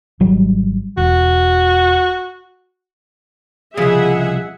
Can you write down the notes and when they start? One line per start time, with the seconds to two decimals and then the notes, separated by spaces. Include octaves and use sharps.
0.20 G#1 F#3 G3
0.97 E1 F#4
3.77 C2 C#3 F3 F4 G#4 D#5 E5 F#5